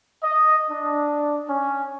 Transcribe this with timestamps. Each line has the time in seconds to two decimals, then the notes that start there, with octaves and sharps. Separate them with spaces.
0.24 D#5
0.70 D4
1.49 C#4